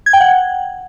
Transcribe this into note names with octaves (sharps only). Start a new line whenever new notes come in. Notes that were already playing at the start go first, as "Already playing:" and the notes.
G#6
G5
F#5